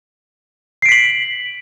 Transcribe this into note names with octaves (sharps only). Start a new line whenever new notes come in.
B6 C7 D7 F#7